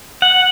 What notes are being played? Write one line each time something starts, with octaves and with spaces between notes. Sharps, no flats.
F#5